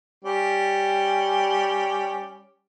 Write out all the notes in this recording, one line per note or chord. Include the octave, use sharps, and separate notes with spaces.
G3 C#4 G4